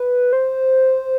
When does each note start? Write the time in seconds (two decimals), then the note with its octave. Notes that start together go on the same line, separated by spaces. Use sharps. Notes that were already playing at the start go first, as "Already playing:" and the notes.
Already playing: B4
0.33 C5